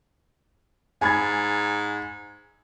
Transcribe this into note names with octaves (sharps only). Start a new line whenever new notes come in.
G#2 G#5 B5 G#6